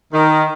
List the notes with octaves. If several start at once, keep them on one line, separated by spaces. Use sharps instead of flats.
D#3